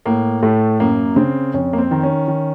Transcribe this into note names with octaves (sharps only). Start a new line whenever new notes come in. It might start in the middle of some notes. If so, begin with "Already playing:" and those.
A2 A#3
A2 A3
F#2 A#3
C#3 C4
F2 C#4
A#3
C4
D#3
C#4
D#3